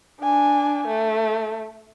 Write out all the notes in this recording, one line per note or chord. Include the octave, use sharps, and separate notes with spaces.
D4 G#5
A3